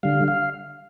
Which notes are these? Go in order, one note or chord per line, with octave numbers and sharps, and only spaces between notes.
D3 G3 F5
F5